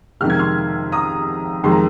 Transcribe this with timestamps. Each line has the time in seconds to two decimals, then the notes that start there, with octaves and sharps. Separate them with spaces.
0.20 F2 C3 D#3 G#3 F6
0.30 G#6
0.39 C6 F6
0.92 A#5 D#6
1.64 F2 D#3 G#3 C6
1.72 A#5